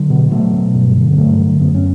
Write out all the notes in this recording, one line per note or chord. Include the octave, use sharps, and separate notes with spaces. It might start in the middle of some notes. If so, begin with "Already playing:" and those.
Already playing: D3 F#3
B2
B2 F#3 A3
B2
G2
D3
B3
G2 F#3 A3
D3
F#2 B3
C#4